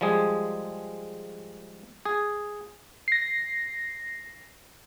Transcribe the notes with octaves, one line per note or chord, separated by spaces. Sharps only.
F3 G3 G#3 G#4
G#4
A#6 C7